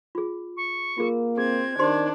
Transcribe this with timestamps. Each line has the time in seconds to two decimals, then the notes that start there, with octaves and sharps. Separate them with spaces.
0.15 F4 G#4
0.57 C#6
0.98 A#3 F4 G#4 A#4
1.38 C4 G#4 G#6
1.79 D#3 D4 G4 C5 C6